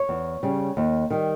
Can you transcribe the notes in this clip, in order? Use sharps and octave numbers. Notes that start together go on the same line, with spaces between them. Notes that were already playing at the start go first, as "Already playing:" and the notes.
Already playing: C#5
E2
C#3 G3
D#2
D#3 G3